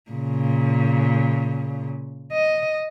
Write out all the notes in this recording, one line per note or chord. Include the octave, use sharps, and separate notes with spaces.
A#2 C#3
D#5